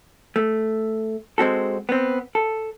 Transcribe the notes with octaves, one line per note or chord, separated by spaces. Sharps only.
A3
G#3 C4 F#4 A4
B3 C4
A4